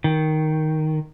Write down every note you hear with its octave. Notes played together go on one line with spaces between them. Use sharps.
D#3